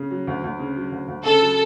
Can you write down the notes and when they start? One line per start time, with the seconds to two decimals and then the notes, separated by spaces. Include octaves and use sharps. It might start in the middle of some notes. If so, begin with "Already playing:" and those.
Already playing: C#3
0.11 F#3
0.27 D2
0.44 D2
0.59 C#3
0.76 F#3
0.92 D2
1.08 D2
1.24 C#3 A4
1.41 F#3